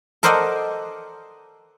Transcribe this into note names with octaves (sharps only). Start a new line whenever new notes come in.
A4 A#4 C5 D5 D#5 F#5